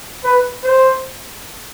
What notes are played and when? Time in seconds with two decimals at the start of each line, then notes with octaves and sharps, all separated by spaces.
0.24 B4
0.64 C5